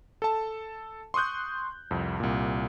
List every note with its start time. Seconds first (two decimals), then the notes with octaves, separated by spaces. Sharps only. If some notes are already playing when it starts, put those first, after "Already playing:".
0.22 A4 A5
1.14 C6 C#6 D#6 F#6 G6
1.91 C2 F2
2.20 C2 A#2